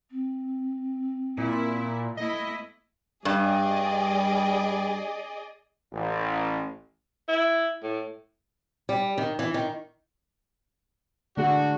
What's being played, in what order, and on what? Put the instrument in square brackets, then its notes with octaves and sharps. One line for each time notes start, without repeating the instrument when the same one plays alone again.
[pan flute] C4
[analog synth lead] A#2 [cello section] E4
[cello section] A3 B3 E4 [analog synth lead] D#5
[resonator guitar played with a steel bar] G2 [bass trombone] G3 [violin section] G#4 D5 D#5
[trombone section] A1
[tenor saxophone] E4
A2
[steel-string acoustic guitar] G3
D#3
E3
D#3
[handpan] D3 A3 G#4 [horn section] D4 F#4